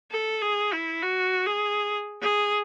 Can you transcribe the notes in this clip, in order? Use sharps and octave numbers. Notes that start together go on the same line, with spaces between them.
A4
G#4
E4
F#4
G#4
G#4